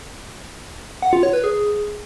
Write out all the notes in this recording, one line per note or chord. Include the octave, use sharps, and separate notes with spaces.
F#5
F4
C#5
B4
G#4